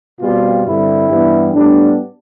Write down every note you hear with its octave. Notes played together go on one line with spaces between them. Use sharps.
B2 G3 C4 F4
G2 D3 G3 C4 E4
G2 E3 G3 B3
A2 G3 B3 D4